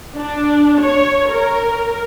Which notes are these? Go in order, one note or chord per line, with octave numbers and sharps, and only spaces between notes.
D4
C#5
A#4